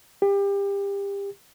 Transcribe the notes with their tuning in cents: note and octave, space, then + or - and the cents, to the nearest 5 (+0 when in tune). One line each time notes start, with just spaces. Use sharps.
G4 +30